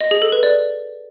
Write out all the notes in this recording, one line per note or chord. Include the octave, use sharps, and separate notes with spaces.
D#5
G#4
A4
B4
D5